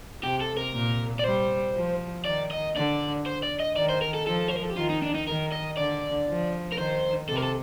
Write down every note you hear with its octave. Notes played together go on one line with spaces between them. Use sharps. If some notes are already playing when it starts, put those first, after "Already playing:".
C3 G4
A4
A#4
A#2
D5
G3 C5
F3
D#3 D5
D#5
D3 D5
C5
D5
D#5
D#3 D5
C5
A#4
A4
F3 A4
C5
A#4
A4
G4
D#3 F4
D#4
D4
D#4
D#3 A#4
D#5
D3 D5
F3
A#4
D#3 C5
C3 A4
A#4
A4